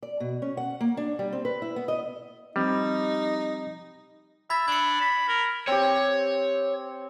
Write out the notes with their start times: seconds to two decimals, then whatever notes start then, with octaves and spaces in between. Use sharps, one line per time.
0.03 D5
0.20 B2
0.42 C#4
0.57 F#5
0.81 A#3
0.97 D4
1.19 G3
1.32 C4
1.45 B4
1.62 E4
1.76 B3
1.88 D#5
2.56 F3 G3 C4 D#4 G4
4.50 E5 B5 G#6 A6
4.68 D4 G#6 C#7
5.01 B5
5.28 A#4
5.67 C4 G4 C#5